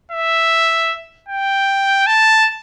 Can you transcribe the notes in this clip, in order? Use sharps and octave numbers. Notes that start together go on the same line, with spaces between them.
E5
G5
A5